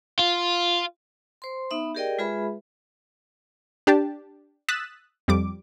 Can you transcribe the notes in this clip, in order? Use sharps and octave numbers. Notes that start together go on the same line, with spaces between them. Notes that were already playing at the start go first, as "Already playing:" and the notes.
F4
C5 C6
B3 D#4 E5 B5
G4 G#4 A#4 D5 D#5 G5
G#3 F4 G#4 B4 E5 B5
D4 G4 A5
D#6 E6 F#6 A6 B6 E7
F2 G3 D6